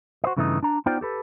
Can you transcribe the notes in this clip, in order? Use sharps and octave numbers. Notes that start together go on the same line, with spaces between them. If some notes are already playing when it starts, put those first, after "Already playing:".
F#4 C5 D#5
G2 C#3 E3 A3 D#4 D#5
D4 A#5
B3 D#4 F4 C5 D5 G5
G4 A4 B4